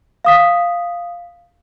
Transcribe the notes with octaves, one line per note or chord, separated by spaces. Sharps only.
F5 D#6 B6